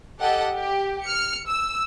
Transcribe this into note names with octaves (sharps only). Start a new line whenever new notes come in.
G4 A4 D#5 F#5
G4
F6 C#7
E6